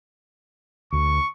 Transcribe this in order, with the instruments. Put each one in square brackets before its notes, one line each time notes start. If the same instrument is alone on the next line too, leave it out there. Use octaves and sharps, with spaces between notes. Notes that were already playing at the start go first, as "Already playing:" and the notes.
[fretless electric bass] D2 [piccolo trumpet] C#6